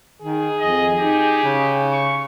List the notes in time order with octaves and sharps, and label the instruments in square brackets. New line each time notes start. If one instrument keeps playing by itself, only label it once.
[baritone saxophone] D#3 [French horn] G#4
[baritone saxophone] F2 [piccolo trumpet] D#5
[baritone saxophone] D#4 [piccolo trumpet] G4
[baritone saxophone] C#3
[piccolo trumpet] C#6